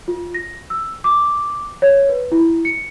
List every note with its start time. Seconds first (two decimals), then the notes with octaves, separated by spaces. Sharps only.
0.08 F4
0.34 A#6
0.70 E6
1.04 D6
1.82 C#5
2.09 B4
2.32 E4
2.65 C#7